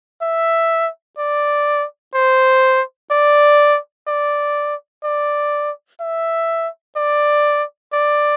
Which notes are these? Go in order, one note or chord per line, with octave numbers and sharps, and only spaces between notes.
E5
D5
C5
D5
D5
D5
E5
D5
D5